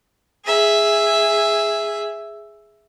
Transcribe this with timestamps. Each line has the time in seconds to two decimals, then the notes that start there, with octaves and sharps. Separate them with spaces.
0.45 G#4 E5